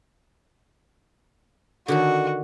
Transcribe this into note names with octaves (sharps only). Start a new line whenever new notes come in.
D3 D#3 F#4 A4